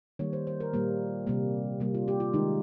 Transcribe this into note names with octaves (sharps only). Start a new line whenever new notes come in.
D#3 G3 A#3 C#5
C5
C5
A#4
A#2 G3 A#3
C3 G3 A#3
C3 G3 A#3
F4
G4
F4
D#3 G#3 D#4